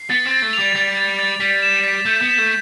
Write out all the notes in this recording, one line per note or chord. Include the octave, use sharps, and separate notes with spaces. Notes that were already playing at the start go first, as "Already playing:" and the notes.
Already playing: C7
B3 A6
C4
A6
A3
F7
G3
G3 A6
A6
A6
G3 B6
E7
B6
A3 G6
B3
E7
A3